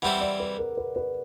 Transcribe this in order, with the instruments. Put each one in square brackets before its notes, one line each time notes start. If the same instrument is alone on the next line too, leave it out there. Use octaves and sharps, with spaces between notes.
[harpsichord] E3 G3 C4 E4 [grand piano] F#5
[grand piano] D5
B4
A#4
B4
B4